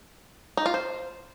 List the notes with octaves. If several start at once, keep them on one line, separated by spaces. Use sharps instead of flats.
D#4
F4
C5